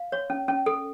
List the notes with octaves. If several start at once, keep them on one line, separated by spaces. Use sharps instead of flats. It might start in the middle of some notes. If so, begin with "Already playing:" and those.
Already playing: F5
C#5
C#4
C#4
A4